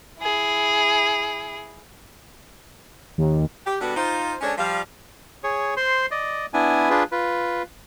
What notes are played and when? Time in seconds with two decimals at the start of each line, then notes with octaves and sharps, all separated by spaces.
0.20 E4 G#4
3.18 D#2
3.66 G4
3.81 B2 G3 B3 D4 F#4 A4
3.96 D#4 F4 C5
4.41 G#3 C#4 D4 A4 C5 C#5
4.58 F3 G3 F5
5.44 G#4 C#5
5.77 C5 C6
6.11 D5 D#5
6.54 B3 D4 E4 G#5
6.90 D4 F4 G#4 B4
7.12 F4 B4